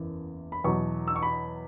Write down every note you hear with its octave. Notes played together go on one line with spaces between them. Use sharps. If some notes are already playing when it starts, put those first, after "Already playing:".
Already playing: F#1 E2 E3
B5
E2 B2 F#3 C#6
E6
C#6
B5